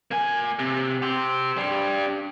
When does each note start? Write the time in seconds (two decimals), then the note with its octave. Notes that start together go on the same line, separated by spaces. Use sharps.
0.11 A#3 G#5
0.59 C3
1.02 G4 C5
1.57 D4 G4